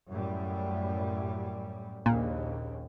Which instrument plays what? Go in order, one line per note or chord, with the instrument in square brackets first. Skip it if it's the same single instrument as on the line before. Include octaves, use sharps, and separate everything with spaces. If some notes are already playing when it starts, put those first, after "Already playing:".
[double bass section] F#2 A2 G3
[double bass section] A#1 D#2 C#3 [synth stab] A#2